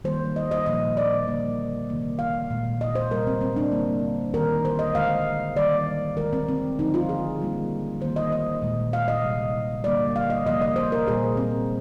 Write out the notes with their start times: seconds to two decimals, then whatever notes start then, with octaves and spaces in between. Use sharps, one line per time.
0.04 D#3 G3 A#3 C5
0.36 D#5
0.51 D#5
0.66 A#2 F3 A#3 D#5
0.97 D5
1.27 D3 G3 A#3
1.89 C3 D#3 A#3
2.19 F5
2.50 A#2 G#3
2.81 D#5
2.95 C5
3.11 C3 G3 A#3 A#4
3.27 C4
3.41 C4
3.56 D4
3.72 D3 G3 A#3
4.33 D#3 A#3 A#4
4.65 C5
4.79 D#5
4.95 D3 G#3 F5
5.56 D#3 G3 A#3 D5
6.17 D#3 G#3 A#4
6.33 C4
6.49 C4
6.79 D3 F3 G#3 D#4
6.94 F4
7.09 G#4
7.39 D3 G3 A#3
8.01 D#3 A#3 C5
8.16 D#5
8.32 D#5
8.62 A#2 G#3
8.93 F5
9.08 D#5
9.23 C3 G3 A#3
9.84 D3 G3 A#3 D5
10.16 F5
10.30 D#5
10.46 C3 F3 A#3 D#5
10.62 D#5
10.76 C5
10.92 A#4
11.07 A#2 G3 A#3 G#4
11.37 C4